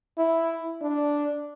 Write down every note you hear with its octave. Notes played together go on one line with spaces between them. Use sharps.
E4
D4